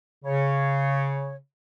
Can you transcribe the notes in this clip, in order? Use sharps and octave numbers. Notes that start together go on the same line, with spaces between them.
C#3 C#5